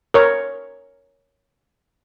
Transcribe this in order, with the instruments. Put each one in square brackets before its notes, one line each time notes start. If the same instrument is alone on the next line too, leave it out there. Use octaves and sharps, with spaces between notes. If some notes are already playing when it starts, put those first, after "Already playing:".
[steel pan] A#4 C#5